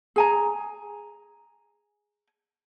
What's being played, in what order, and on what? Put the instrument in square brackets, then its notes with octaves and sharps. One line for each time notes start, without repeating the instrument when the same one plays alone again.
[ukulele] G#4 G#5 A#5